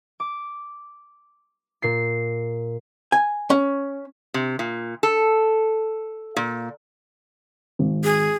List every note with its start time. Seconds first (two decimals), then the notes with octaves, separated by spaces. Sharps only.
0.20 D6
1.82 A#2 C7
3.12 G#5
3.50 C#4
4.34 C3
4.59 A#2
5.03 A4
6.36 A#2
7.79 G#1
8.04 G#4